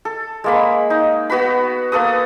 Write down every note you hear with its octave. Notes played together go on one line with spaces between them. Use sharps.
A4
G#3 A#3 B5
D#4
B3 F#4 B4 B5
A#3 A4 B4 D#6